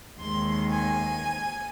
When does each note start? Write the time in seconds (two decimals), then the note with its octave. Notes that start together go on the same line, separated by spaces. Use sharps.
0.20 D#2 D#3 G#3 C6
0.70 G#5